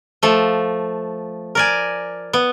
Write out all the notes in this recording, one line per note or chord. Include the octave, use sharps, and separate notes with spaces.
F3 A3
A#4 D5 G#5
B3